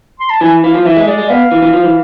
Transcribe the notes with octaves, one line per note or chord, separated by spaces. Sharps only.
C6
A5
E3 G#5
E3 F5
F3
E3 E5
G#3
G#3 D5
G#3
B3 F5
E3
E3
F3
E3